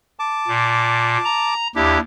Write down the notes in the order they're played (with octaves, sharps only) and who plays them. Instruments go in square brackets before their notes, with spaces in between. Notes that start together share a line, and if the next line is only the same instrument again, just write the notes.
[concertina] A5 D6
[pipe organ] A#2
A#5
[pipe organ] D#2 G4 [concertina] D4 E4